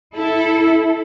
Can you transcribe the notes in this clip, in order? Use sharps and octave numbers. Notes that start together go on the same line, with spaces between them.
E4 A4